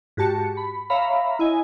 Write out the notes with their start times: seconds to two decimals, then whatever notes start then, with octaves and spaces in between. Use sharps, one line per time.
0.17 G#2 F#4 G4 A5 C#7
0.57 B5
0.90 C#5 E5 F5 A#5 B5
1.39 E4 D#5 G#5